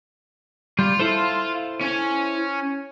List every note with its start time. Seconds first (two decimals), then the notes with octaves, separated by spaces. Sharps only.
0.79 G3 F4
1.00 E4 A4 C5
1.81 C#4 G#5